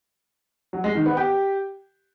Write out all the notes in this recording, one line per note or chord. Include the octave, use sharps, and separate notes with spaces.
F#3
G#3
D#3
B3
G4